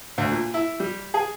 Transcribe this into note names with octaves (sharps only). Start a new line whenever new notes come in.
D2
A#2
E4
G3
G#4